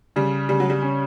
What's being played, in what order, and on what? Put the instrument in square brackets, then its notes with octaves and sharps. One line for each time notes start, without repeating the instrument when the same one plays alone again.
[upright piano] C#3 [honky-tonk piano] G3
[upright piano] C#3 [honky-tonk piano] G3
[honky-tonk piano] F#3
G3
[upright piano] C#4